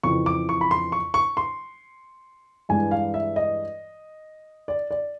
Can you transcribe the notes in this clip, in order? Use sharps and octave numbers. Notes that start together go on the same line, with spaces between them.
F2 C#3 E3 C#6
D6
C#6
B5
C6
C#6
C#6
C6
G2 E3 G#3 G#5
F5
E5
D#5
D5
D5